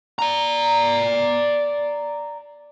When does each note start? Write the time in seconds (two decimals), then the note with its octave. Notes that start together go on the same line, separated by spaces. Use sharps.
0.19 D5 A#5